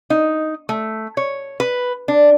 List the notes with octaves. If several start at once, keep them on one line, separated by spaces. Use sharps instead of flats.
D#4
A3
C#5
B4
D4